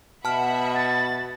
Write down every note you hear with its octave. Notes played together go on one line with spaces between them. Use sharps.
B2 E5 F#5 A5 B5 F6
A6